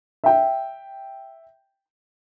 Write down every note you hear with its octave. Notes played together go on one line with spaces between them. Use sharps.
E5 G5